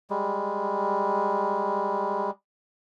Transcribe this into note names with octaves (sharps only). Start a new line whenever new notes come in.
G3 G#3